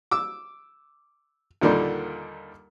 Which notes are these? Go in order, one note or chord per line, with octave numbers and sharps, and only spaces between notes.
D6 E6
D#2 A#2 D3 D#3 G3